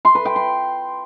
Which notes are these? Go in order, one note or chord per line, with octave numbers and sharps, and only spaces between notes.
C6
B4
G5
C6